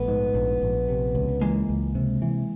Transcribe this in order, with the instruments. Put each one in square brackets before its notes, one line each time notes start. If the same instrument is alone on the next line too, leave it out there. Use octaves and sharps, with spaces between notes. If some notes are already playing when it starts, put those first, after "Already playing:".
Already playing: [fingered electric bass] A#1 [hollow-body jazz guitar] A3 B3
[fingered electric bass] G#2
A#1
A#1
C3
C#2
[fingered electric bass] E3 [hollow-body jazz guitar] G#3 A#3
[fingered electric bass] C#2
C3
E3